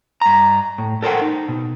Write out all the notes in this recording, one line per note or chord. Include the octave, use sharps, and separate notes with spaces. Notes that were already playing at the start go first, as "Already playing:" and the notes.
G2 A#5
A2
A4 A#4 C5 F#5 G5
D#4
B2